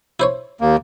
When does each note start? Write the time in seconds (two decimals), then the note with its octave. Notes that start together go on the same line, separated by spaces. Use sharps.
0.20 E4 C5 C#5
0.61 D#2 A#3